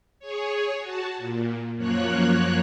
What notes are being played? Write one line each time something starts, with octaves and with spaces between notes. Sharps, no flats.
G#4 C#5
F#4 A5
A#2
F#2 F3 A#3 C#5 F#6